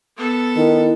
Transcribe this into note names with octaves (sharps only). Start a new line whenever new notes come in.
B3 A4
D#3 E4